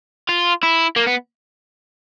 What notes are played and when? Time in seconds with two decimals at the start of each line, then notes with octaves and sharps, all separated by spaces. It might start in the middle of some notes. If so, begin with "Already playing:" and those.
0.29 F4
0.63 E4
0.96 A#3
1.07 B3